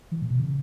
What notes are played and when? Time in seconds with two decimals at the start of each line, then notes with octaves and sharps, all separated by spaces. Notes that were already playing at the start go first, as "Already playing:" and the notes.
0.12 E3
0.22 A#2
0.30 B2
0.40 C#3